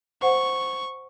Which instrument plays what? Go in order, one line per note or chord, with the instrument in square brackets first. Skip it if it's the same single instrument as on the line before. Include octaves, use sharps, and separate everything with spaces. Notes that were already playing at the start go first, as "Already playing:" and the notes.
[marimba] C5 F#5 [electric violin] C#6